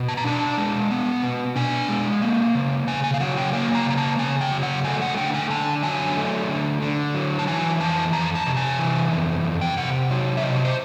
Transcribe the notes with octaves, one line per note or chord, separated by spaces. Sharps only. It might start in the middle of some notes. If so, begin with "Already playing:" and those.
Already playing: B2
A5
A#5
D4 A5
G#3
B3
B2
D4 G#5
G#3
A#3
C#3
C#3 G#5
G#5
F5
F#3 F#5
G5
A#3 G#5
A#5
C#3 A#5
A5
C#3 G#5
G5
F#3
F#5
A3 G#5
F#5
D3 G5
G#5
D3 A5
F#3 G#5
A3
D3
D3
F#3
A5
E3 G#5
F2 A5
F2 A#5
A5
C3
G#5
E3
F2
F2
G5
C3 F#5
F#3
E5
C3 D#5
C5